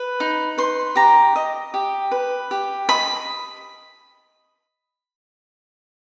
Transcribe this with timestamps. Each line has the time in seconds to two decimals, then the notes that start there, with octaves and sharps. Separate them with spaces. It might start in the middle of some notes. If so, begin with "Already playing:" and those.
Already playing: B4
0.20 D#4
0.58 B4 C6
0.96 G4 A#5
1.36 D#5
1.74 G4
2.11 B4
2.51 G4
2.89 D#5 B5